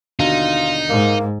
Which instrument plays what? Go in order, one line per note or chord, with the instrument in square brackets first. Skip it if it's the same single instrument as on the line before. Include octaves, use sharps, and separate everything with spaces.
[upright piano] D#2 B2 D3 [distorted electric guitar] D#4 [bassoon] F4
[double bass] G#2 [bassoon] A#3